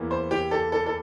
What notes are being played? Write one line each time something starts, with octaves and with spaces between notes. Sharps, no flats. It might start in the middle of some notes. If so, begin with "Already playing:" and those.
Already playing: E2 E3 A#3
C5
G4
A4
A4
A4